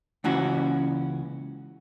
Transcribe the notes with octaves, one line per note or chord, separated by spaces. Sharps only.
C#2 E3 C#4 F#4